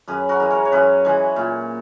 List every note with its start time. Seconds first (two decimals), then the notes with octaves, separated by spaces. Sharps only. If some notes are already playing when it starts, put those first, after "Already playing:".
0.08 F#2 G#4 B4
0.29 F#4 A#4
0.40 E3 G#3
0.50 A#4 C#5
0.65 C#5
0.72 F#2 G#4 B4
1.05 E3 G#3
1.36 A#2